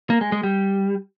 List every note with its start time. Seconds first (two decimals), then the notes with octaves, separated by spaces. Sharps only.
0.10 A#3
0.21 G#3
0.32 G#3
0.43 G3